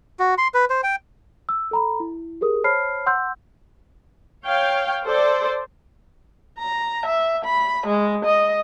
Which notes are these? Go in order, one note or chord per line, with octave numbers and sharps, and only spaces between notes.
F#4
C6
B4
C5
G5
E6
A4 A#5 B5
E4
G4 G#4 A#4 D#6
C5 C#5 A5 B5 F6 C7
F#5 C6 E6 F#6 G6
C#5 F5 G5
A4 C5 D5
A#5
E5
B5
G#3
D#5